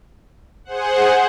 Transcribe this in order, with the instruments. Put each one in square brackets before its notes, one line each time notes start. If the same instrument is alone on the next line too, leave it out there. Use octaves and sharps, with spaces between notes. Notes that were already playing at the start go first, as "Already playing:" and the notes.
[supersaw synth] G#4 C5 F#5